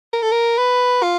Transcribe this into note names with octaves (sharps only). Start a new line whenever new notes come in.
A#4
A4
A#4
B4
F4